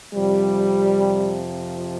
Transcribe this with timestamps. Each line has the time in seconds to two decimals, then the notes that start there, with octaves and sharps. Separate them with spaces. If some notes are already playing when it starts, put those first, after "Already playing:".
0.13 F2 C3 F3 G3